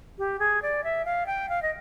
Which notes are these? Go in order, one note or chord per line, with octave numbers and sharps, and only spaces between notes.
G4
G#4
D5
E5
F5
G5
F5
D#5